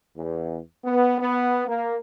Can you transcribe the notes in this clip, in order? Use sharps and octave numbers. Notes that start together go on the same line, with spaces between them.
E2
B3
B3
A#3